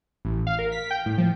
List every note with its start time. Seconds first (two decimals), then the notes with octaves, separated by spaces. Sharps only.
0.25 A1
0.47 F5
0.59 A#4
0.72 B6
0.91 G5
1.06 A2
1.18 F3